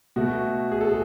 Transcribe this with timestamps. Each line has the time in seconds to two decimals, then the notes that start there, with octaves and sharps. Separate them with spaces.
0.16 B2 A3 F#4
0.71 G#4
0.81 A4
0.88 G#4